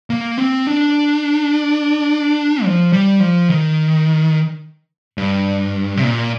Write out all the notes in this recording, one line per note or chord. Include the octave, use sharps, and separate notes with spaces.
A#3
C4
D4
F3
G3
F3
D#3
G2
C3
A#2